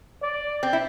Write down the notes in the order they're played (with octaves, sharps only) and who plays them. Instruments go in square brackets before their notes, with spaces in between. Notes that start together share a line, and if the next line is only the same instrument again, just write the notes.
[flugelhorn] D5
[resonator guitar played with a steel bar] C4
E4